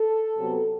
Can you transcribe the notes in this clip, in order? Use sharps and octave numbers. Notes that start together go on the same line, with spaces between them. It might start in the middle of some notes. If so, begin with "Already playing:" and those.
Already playing: A4
C3 F#3 B3